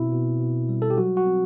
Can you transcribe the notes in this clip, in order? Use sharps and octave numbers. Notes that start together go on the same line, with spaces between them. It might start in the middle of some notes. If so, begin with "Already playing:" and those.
Already playing: B2 C4 E4
B2
B2
G3
A4
G4
F#3 F#4
F#4
C4